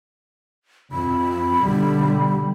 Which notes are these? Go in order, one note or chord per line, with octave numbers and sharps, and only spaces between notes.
F2 B5
B1 D3 G3